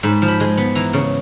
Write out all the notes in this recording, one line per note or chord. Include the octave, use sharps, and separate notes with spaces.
G#2 B5
F3
B5
G#3
B3
E3 A#5
C#3